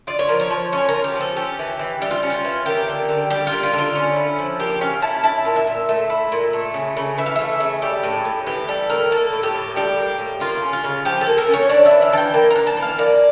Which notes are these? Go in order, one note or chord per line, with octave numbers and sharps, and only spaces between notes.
F4 D5
C#5
F3 A#4
C#5
F3
C#4 C#5
F4 A#4
G4
F3 A4
C#4 G4
E3
E3
G3 G4
F4
C#4
F4
E3
A#3 G4
D3
D3
G3 G4
F4
A#3
F4
D3 F4
C#4
E4
F3
A#3 G4
C#4 F5
E4 A5
E4 A5
A#2
E5
A#2
A3
E4
A#2
A3
C#3
C#3
E3 E5
F5
A3 E5
C#3
G3 G4
A2
A2
E3 G4
G3 A4
A2 A#4
A#3 A4
A2
G4
A2
G3 G4
A#3
A2
A#3 F4
C#4
F4
C#3
F3 G4
A4
A#3
A#4
C#4
C#5
D4 D5
E5
E3
F5
E3 G5 A5
A#3
A#5
D4
A5
E3
F5
A#3 D5